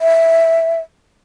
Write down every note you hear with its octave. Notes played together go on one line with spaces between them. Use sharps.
E5